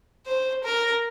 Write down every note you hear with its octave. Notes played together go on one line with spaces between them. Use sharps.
C5
A#4